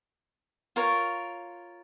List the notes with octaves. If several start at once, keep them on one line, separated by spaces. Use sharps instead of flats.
F4 A#4 C#5